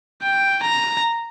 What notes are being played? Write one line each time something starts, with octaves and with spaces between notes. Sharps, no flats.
G5
A#5